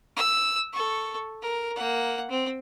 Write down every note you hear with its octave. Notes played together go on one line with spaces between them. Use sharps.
E6
A4 C#6
A#4
A#3 F#5
C4